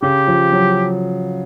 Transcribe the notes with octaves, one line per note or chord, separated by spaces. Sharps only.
C#3 G4
F3
F#3